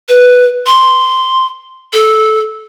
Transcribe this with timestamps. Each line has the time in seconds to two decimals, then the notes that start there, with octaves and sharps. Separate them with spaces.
0.09 B4
0.67 C6
1.93 A4